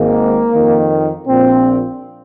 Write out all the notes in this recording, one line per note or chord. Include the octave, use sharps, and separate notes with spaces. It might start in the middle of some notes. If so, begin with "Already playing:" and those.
Already playing: G#1 G#2 D#3 A#3
F2 D#3
A#1 A#2 C4